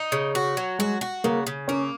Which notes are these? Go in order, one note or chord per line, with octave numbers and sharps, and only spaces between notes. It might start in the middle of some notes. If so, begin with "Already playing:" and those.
Already playing: D#4
C#3
F#4
F#3
G#3 F#4
F#4
C#3 A#3
C#3
A#3 C#4